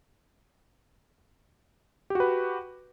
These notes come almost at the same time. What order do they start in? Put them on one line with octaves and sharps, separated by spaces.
G4 F#4 B4